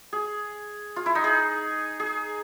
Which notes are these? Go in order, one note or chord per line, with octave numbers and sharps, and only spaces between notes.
G#4
F4
E4
D#4
G#4
G#4